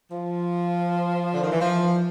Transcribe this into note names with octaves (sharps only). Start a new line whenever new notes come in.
F3
D3
D#3
E3
F3